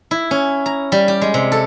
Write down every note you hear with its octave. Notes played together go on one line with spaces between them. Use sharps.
E4
C#4
A#5
G3
G4
G#3
C3
A4